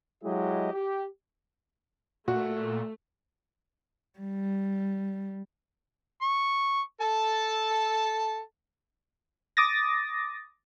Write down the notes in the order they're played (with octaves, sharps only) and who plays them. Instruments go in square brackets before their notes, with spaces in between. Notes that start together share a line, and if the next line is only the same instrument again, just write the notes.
[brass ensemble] F#3 G#3 E4 G4 D#5
G4
[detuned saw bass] A#2 [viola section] A3 [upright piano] F#4
[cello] G3
[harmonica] C#6
A4 A5
[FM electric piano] D6 D#6 A6 A#6